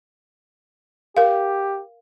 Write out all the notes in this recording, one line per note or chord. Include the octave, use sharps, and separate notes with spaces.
G4 A#4 F5